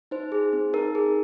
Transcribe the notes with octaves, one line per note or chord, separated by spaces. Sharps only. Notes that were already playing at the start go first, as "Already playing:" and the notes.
D#4 C5
G#4
C4
D#4 A#4
G#4